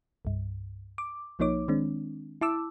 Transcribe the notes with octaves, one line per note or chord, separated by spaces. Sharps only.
C2 G2
D6
B1 F3 A#3 D#4 C#5 D6
D#3 G#3 C4 D4
E4 A5 D6 E6